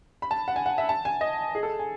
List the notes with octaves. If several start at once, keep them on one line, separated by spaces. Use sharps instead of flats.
B5
A5
F#5
G#5
F#5
E5
A5
G#5
D#5
G#4
A4
G#5